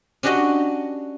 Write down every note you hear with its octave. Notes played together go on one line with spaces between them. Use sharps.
C#4 D4 F#4 G4 D#5 F#5